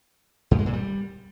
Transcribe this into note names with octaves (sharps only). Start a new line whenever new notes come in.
G2
G#3
A#2
G3